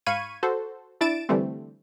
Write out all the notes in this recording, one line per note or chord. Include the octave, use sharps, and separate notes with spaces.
G#2 F5 B5 C#6 G#6 D#7
F#4 A4 C5
D4 E4 A6 D7 E7
D3 E3 G3 A3 C4